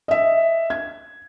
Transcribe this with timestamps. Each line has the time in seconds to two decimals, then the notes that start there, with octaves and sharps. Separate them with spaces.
0.08 D#5 E5
0.70 G#6